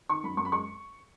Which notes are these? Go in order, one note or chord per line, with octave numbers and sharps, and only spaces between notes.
D#3 C#6
F#2 B5
F#2 C#6
B5
G#3 C#6